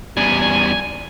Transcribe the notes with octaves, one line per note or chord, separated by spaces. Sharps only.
E2 G3 G#5